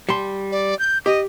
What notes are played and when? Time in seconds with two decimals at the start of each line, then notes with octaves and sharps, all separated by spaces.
0.09 G3 A5 C6
0.52 D5
0.79 G6
1.06 G4 D#5